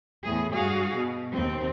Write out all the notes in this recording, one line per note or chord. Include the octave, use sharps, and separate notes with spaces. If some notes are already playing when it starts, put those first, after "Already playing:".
E2 A2 G#4
G2 F#4 G#4 F5
B2
D#2 C4